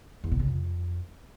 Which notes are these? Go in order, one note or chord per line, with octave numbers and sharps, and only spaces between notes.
E2
B2
C#3
F2